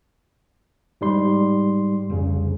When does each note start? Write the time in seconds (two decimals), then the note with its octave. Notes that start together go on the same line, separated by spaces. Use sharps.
1.01 G#2 G3 C6
2.10 F1 C2 C#3